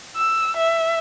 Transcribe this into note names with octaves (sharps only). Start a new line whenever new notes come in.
E6
E5